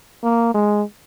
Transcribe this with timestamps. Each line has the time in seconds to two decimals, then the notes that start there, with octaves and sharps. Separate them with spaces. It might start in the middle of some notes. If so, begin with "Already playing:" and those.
0.23 A#3
0.54 G#3